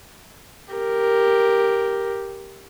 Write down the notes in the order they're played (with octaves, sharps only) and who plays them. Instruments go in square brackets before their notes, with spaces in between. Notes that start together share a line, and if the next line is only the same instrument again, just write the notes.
[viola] G4 A#4